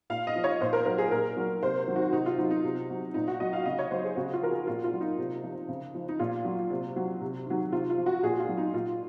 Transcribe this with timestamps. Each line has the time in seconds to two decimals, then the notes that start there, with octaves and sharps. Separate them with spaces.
0.10 A#2 F5
0.27 D#5
0.36 F3
0.44 C#5
0.61 A#2 C5
0.73 A#4
0.86 F#3 A#4
0.98 G#4
1.11 A#2 A#4
1.37 F#3
1.62 C3 C5
1.88 D#3 F#3
1.96 F#4
2.13 C3 D#4
2.26 F4
2.38 F#3 D#4
2.51 D#4
2.64 C3
2.90 F#3
3.14 A#2 D#4
3.28 F#4
3.40 F#3 D#5
3.53 F5
3.66 C#3 D#5
3.79 C#5
3.91 F#3 C5
4.04 G#4
4.16 C#3 F#4
4.33 F4
4.42 F3 A#4
4.50 G#4
4.67 A#2 F4
4.84 F4
4.92 F#3
5.01 D#4
5.18 C3
5.43 F3
5.69 C#3
5.94 F3
6.09 D#4
6.19 A#2 F4
6.45 F#3
6.70 C3
6.96 F#3
7.21 C3
7.46 D#3 F#3
7.72 C3 F4
7.90 F4
7.98 F3
8.06 F#4
8.23 A#2 G#4
8.40 F4
8.48 F#3
8.58 D#4
8.74 A#2 F4